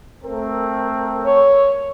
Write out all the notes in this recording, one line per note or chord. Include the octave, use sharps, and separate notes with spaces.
A3 C4 A#4
C#5